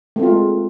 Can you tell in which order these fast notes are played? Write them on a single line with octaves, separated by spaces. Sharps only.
A3 C4 F4 G#3